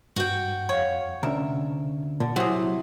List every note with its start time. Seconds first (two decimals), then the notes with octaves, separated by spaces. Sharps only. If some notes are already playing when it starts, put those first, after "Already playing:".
0.16 G2 F#4 G5
0.69 F2 C#5 F5
1.23 D2 C3 C#4 A#4 E5
2.20 A#2 D3
2.36 C3 F#3 E4 F#4 G#4 F#5